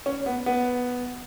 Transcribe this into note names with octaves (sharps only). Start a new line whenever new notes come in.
C#4
B3
B3